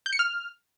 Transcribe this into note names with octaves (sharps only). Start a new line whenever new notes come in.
G6
C#7
F6